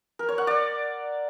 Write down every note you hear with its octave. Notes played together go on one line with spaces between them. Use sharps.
A#4
C#5
F#5
D5